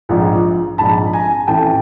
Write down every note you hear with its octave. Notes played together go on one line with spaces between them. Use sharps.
A#1 G#2 F3
A#1 G#2 F3 A5 B5
G#5 A#5
A1 A2 E3 G5 A5